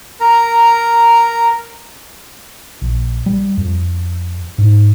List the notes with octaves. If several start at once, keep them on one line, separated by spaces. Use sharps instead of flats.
A#4 A#5
A#1
G3
F2
G#2